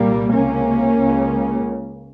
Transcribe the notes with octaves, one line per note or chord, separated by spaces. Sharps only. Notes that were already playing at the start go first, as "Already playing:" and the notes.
Already playing: C2 A#2 G3 A#3
C#2 C3 A#3 C#4
C#2 C#3